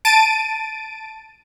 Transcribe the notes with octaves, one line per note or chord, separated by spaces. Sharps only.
A5 A6 D7 D#7